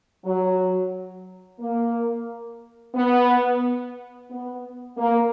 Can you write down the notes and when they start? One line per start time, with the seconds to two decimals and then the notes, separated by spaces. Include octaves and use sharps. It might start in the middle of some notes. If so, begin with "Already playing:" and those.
0.25 F#3
1.60 A#3
2.95 B3
4.30 B3
4.98 A#3